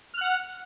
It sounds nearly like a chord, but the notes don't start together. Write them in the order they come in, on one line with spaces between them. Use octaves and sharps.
F6 F#6 F#5